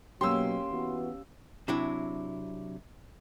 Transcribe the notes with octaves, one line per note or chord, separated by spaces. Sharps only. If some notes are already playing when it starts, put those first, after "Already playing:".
B2 F#3 A#3 C#4 G4 C6 E6
E3 B3 F#4
C3 F#3 D4 E4